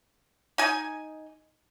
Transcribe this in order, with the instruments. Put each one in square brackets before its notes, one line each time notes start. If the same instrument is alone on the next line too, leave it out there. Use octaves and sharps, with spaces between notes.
[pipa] D#4 G#5